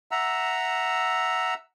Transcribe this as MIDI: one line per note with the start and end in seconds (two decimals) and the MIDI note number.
0.11 1.54 76
0.11 1.54 78
0.11 1.54 82
0.11 1.54 88